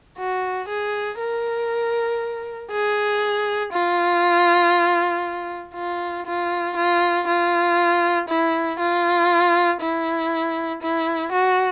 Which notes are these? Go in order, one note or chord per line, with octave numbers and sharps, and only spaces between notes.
F#4
G#4
A#4
G#4
F4
F4
F4
F4
F4
E4
F4
E4
E4
F#4